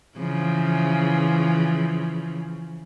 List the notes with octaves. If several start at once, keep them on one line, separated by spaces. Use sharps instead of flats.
C#3 E3 F3